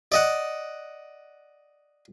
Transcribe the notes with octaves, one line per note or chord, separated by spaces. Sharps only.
D5 D#5 F#5